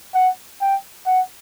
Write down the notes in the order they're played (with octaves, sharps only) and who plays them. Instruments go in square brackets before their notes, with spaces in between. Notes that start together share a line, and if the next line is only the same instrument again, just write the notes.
[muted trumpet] F#5
G5
F#5